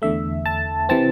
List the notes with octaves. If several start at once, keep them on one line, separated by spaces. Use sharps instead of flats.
E2 D3 A3 E5
A5
C3 E3 C4 A5